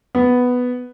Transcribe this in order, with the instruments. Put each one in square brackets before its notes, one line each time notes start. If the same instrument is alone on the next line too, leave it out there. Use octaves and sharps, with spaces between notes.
[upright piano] B3